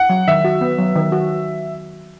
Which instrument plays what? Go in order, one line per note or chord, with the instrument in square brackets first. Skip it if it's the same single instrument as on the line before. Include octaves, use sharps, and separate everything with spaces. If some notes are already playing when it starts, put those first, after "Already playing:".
Already playing: [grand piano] F#5
[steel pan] F#3
[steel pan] D#3 [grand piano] E5
[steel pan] F#4
B3
F#3
D#3
F#4